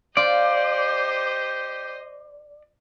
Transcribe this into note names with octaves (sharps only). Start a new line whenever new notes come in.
F4 G4 C5 D5 D#5